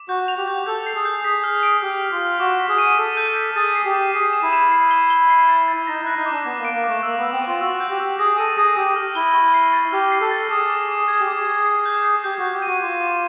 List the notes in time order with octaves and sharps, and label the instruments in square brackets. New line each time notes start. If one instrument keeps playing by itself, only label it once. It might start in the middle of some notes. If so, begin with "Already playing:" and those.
Already playing: [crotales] D6
[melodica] F#4 [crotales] G6
[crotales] F7
[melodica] G4
[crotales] G6
[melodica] A4 [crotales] G6
[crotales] C7
[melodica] G#4
[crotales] G6
[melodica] G#4 [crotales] B6
[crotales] F6
D7
[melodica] G4 [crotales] F6
[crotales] F6
[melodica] F4
[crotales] F6
[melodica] F#4 [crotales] D6
[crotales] B6
[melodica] G#4
[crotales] D#7
[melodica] A4 [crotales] B6
[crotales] G6
B6
[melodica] G#4 [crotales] A6
[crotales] C7
[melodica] G4
[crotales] E7
[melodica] G#4 [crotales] C7
[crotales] E7
[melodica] E4
[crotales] E7
C7
G7
G7
C7
A6
A6
[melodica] D#4 [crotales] A#6
[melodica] E4 [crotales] F#6
[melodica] D#4
[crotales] D6
[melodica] D4
[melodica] B3 [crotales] D6
[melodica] A#3
[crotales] D7
[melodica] A#3
[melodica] A3 [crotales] D6
[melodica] A#3 [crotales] E6
[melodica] B3 [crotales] E6
[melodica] C4
[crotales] C#6
[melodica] F4
[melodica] F#4 [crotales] E6
[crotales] G6
[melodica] G4
[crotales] E6
[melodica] G#4 [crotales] A#6
[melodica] A4 [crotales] D#7
[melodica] G#4 [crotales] A#6
[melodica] G4 [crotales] A#6
[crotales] F6
[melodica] E4 [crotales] G7
[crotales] C#6
C7
A6
[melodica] G4 [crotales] F6
[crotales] C7
[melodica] A4
[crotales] A6
[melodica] G#4 [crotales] D6
[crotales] D6
D6
[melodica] G#4 [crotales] G#6
[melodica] G4
[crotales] D6
[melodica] G#4
[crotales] D6
C7
G6
C7
[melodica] G4 [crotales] G6
[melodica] F#4
[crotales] G6
[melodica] G4
[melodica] F#4 [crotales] D#7
[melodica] F4 [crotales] D6
[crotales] D6